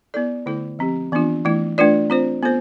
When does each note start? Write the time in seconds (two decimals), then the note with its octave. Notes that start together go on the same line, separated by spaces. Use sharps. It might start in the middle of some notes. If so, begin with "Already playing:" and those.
0.14 B3 E4 A4 D5
0.46 D3 A3 E4 A4
0.79 F3 C4 G4
1.12 E3 B3 D4 F4
1.45 E3 A3 E4
1.78 A3 D4 F4 B4 D5
2.10 C4 F4 C5
2.43 B3 F4 A4 C5